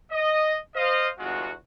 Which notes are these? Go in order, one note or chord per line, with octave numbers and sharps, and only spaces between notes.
D#5
C5 D#5 F5
G1 E2 G#3 F4 F#4